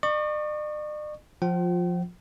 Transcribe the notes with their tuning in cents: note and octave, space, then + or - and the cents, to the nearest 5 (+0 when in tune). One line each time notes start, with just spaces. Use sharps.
D5 +45 C#6 +0
F3 +15 F4 +25 G5 -45